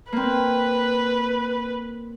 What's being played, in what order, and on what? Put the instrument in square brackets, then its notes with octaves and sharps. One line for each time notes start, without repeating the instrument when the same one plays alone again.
[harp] A#3 C4 [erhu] B4